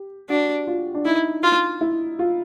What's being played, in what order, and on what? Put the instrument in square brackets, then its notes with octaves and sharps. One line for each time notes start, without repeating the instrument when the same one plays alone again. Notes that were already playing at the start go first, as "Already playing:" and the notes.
Already playing: [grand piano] G4
[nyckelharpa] D4 [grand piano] F#4
[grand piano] F4
D4
[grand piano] D#4 [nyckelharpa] E4
[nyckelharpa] F4
[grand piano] E4
F4